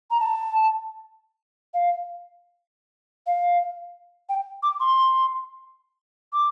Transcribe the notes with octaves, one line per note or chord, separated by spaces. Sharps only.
A#5
A5
F5
F5
G5
D6
C6
D6